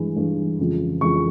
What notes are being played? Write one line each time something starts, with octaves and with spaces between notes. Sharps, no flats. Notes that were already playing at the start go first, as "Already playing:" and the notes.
Already playing: G2 E3 G#3
G2 E3 G#3
F2 C#3 E3 G#3
F2 C#3 E3 G#3 C#6